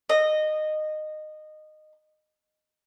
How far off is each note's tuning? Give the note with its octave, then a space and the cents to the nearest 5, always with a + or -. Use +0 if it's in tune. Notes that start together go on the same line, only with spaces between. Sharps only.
D#5 -15